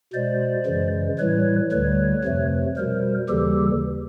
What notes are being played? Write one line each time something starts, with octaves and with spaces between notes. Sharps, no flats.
B2 G#3 C5 D5
F#2 C#3 E3 G#3
A2 E3 G3 B4 C#5
D2 D3 G3 B4 C#5
F2 C3 F3 A3
B2 G3 A#4 C5
D#2 C#3 E3 G3 G4 A4